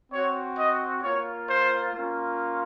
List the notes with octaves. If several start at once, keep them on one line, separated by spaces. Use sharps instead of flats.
C4 F#4 C#5
D#5
A#3 F4 C#5
C5
A#3 C#4 F4